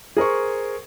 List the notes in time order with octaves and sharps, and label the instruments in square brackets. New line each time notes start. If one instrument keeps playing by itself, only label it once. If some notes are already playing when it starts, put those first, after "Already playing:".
[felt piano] G#4 A#4 C5 C#6